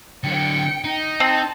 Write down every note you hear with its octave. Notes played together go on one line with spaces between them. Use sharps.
D3 F#3 G5 C#7
D#4
C4 A5